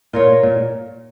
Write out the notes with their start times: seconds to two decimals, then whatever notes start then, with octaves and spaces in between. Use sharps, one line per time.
0.13 A#2 F4 A#4 C#5
0.43 A#2